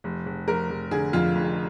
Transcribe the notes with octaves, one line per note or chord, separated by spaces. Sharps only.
F1
F1
F1 A#4
F1
D3 G#4
F2 F4
F1